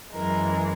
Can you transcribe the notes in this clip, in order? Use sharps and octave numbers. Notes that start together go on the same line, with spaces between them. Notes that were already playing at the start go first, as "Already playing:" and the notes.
F#2 E3 G#3 A#4